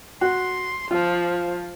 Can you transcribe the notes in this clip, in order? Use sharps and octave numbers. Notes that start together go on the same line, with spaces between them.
F#4 C6
F3 F4